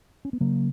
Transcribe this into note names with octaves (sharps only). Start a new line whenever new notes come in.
C#4
B3
C#3 F#3 A#3